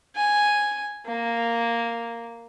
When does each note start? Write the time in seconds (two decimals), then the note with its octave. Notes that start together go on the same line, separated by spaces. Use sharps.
0.16 G#5
1.06 A#3